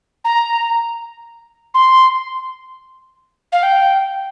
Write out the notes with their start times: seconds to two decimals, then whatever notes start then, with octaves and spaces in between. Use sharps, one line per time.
0.25 A#5
1.74 C6
3.52 F5
3.63 G5